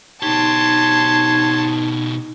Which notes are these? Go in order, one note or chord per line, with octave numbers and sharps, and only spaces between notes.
B2 D#4 G4 C#5 A5 C6